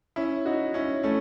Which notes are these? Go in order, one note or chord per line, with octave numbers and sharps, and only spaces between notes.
C#4 E4
D#4 F#4
C#4 E4
A3 C#4